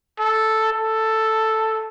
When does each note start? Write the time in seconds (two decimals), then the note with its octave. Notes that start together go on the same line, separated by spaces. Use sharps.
0.19 A4
0.73 A4